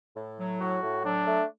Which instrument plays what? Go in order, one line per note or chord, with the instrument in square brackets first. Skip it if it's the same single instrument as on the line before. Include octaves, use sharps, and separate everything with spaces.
[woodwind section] A2
F#3
[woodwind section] A2 [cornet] F#4
[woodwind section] A2
[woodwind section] F#3 [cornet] D4
[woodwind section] A3